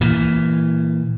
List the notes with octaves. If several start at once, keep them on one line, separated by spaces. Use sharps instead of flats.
A#2 E3